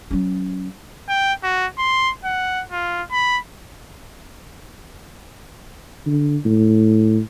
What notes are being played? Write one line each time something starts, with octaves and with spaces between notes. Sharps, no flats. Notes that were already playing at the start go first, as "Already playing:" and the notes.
F#3 C#4
G5
F#4
C6
F#5
F4
B5
D3
A2